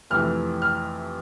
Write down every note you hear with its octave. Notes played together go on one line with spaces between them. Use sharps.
F2 C3 E3 A3 F6
F6